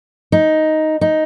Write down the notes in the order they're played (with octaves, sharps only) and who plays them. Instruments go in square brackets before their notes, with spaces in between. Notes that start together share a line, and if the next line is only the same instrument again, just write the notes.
[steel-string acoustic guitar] D#4
D#4